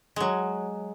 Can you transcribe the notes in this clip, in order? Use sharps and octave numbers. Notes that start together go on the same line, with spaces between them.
F#3 G#3